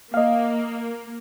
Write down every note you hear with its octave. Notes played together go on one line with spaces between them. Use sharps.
A#3 D#5 F5